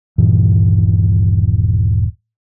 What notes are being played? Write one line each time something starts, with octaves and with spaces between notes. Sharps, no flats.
D#1 G2 A#2 E3